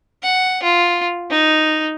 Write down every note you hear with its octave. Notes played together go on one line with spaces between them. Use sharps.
F#5
F4
D#4